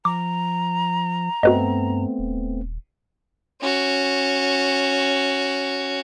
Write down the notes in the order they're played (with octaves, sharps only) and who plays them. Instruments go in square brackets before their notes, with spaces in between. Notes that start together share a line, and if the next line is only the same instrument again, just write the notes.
[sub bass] F3 [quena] A#5 [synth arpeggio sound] D6
[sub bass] G2 [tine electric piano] A3 B3 C4 [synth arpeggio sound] F#4 B4 D#5
[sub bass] D#1
[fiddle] C#4 F#4